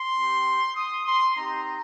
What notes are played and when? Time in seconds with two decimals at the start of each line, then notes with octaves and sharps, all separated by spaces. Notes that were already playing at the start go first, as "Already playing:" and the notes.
Already playing: C6
0.16 C4 G4
0.75 D#6
1.05 C6
1.36 C4 D#4 G4 A#5